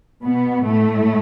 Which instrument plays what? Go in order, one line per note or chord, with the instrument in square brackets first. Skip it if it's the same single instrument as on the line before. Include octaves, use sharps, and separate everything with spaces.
[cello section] B2 B3
A2 A3